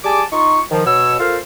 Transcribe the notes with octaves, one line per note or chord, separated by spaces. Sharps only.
G3 G4 G#4 G#5 A5 D6
D#4 F4 C#6
D#3 F3
B2 C#5 E6
F4 A4 A#4 C5 F5